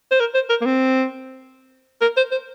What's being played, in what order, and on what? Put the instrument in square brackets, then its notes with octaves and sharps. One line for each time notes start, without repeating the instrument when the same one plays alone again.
[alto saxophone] C5
A#4
C5
A#4
A#3
C4
A#4
C5
C5